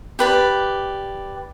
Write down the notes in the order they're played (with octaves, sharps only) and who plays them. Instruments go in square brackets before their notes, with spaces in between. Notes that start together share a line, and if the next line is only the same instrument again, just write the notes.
[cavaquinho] G4 B4 D5